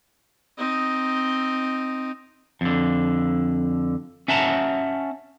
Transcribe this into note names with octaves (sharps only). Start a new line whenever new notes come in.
C4 D#4
F2 D3
C#4 E5 F#5 A5 A#5